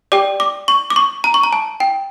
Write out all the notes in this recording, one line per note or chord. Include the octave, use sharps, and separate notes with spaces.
G4 D5 G5 D6
D6
C#6
D6
C#6
A#5
C#6
A#5
A5
G5